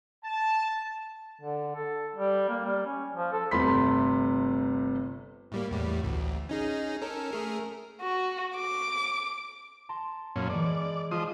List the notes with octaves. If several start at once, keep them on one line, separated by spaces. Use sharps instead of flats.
A5
D3
A4
G3
A#3
G3
C#4
F3
A4
G1 C3 A3 B5 C6 B6
A2 G3 A#3
E2 A2 G3
A1 D2
C#4 D#4 G#4
C#4 A4 A#4
A3 G#4 A#4
F#4
D6
A5 A#5 C6
F#2 A#2 C#4
E3 G#3 D5
F3 G#3 F4 C5 D#6